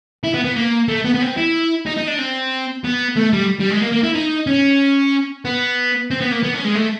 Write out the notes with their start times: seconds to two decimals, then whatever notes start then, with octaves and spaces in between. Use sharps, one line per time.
0.24 E4
0.34 B3
0.45 B3
0.56 A#3
0.88 A3
1.04 B3
1.15 B3
1.21 C4
1.37 E4
1.86 D#4
1.97 D#4
2.07 D4
2.18 C4
2.84 B3
3.16 A3
3.33 G3
3.60 G3
3.71 G#3
3.82 A#3
3.92 A#3
4.04 E4
4.15 D#4
4.47 C#4
5.45 B3
6.10 C4
6.21 B3
6.32 A#3
6.43 B3
6.54 C#4
6.65 G#3
6.76 A3